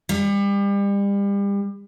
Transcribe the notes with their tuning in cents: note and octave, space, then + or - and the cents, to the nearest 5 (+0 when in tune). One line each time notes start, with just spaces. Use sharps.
G3 +35